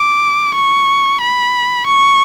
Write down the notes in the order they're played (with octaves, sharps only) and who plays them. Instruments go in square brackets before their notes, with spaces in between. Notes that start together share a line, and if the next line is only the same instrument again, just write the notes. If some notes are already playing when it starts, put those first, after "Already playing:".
Already playing: [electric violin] D6
C#6
B5
C#6